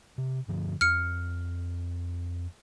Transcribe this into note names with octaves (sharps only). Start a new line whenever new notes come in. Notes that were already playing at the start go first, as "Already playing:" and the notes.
C3
G2 D3 F3
F2 F6 C#7